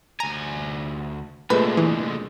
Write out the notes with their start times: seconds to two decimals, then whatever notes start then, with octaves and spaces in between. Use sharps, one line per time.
0.20 D2 G#5 A#5
1.50 C2 A#2 D3 G#3 A3 B4
1.77 E3